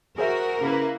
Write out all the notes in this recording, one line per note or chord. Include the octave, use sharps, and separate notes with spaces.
F#4 G#4 A#4 C5 E5
C#3 A#3 E4 B4